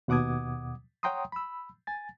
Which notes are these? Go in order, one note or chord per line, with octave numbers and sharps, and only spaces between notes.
D#2 B2 F#5 D6 D#6 G#6
C#5 F#5 G5 A#5 C6 D#6
B5 E6
G#5 A6